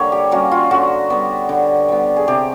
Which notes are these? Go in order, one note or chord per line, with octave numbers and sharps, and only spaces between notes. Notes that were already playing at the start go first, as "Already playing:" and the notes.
Already playing: D3 G3 A#3 C#5
G4
G3 A#3 C#4 F#4
F4
D3 F#4
G3 B3
D3
G3 B3
G#4
C3 G4